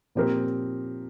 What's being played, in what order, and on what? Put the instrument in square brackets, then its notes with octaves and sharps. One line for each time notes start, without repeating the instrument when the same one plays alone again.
[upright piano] A#2 F3 C4 G4 A#4